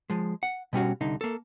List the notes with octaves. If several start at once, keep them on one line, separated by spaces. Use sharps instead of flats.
F3 G#3
F#5
B2 G3 C#4 F#4
C2 D3 D#4
A#3 A4